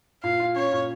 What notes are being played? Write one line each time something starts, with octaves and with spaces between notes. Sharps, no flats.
A#2 F5
F4
C#4 C#5
A#2